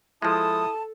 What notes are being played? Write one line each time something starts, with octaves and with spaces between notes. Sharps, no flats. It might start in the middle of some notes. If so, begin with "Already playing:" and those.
F3 G#3 E4 A4 A5 D#6